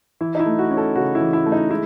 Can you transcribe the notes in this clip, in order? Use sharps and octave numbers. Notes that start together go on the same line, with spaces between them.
E3 E4
D#4
E4
A3
F#4
C#4
A4
C#3 F#4
E4
E3
E4
A3
D#4
G#3 E4